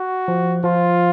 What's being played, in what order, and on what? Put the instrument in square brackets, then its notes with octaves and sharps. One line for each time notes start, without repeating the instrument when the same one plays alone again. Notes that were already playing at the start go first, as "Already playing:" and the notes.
Already playing: [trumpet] F#4
[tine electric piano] F3
[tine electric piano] F3 [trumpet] F4